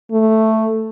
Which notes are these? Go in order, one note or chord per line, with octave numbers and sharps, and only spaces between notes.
A3